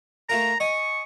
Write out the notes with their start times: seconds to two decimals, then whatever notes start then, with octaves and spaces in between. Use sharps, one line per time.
0.29 A3 F4 A#4 A#5
0.60 D#5 G#5 C#6